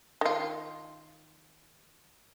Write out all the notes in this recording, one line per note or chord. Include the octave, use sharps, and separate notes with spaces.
D#3 F4